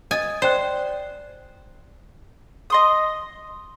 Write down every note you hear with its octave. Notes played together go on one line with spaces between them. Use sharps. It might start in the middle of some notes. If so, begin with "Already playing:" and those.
D#5 G#5 D#6 A6
C5 D5 G5 F#6
D#5 C6 D#6